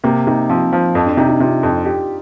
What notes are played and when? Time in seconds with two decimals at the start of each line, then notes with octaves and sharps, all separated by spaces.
0.04 C3 A#3
0.27 C3 D#4
0.49 F3 C4
0.73 F3
0.94 F2 C4
1.06 D4
1.17 C3 D#4
1.29 D#4
1.40 C3 F4
1.63 F2
1.86 G4